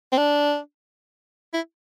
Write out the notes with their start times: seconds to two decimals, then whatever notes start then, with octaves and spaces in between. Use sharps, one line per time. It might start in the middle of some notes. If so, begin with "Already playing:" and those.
0.12 C4
0.18 D4
1.53 E4